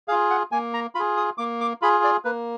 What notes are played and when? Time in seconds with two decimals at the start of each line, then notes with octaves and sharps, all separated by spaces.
0.08 G#4 F5
0.12 F4
0.30 F#5
0.52 A#3 G#5
0.74 A#5
0.95 F4 G#4 B5
1.17 D#6
1.38 A#3 D6
1.61 D6
1.82 F4 G#4 B5
2.04 D5
2.25 A#3 B4